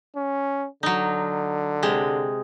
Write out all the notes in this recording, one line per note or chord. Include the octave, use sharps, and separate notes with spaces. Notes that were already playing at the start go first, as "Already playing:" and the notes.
C#4
D3 F#3 D#4
C3 G#3